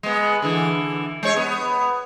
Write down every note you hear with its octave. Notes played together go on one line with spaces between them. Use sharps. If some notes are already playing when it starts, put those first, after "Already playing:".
G#3 B3
D3 E3
G#3 C#5
B3